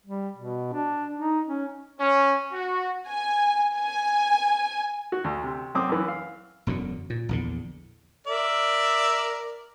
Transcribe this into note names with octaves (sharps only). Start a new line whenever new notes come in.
G3
B2
D4
D#4
C#4
C#4
F#4
G#5
G#5
F#4
D2
C3
F#2 C4 D6 D#6
F#2 E3
F5
E1 F#2 B2 D3
A#2
A#1 E2 D3
A#4 D5 E5